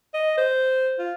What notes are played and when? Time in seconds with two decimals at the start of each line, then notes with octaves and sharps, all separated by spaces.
0.14 D#5
0.37 C5
0.99 F4